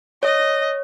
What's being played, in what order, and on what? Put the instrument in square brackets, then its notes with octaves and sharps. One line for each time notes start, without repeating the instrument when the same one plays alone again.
[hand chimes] C#5 [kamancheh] D#5